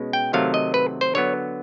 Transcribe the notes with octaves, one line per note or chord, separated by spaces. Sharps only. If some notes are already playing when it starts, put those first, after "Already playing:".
Already playing: B2 G#3 C#4
G5
C3 D#3 F#3 A3 F5
D#5
B4
C5
D3 F#3 B3 C#5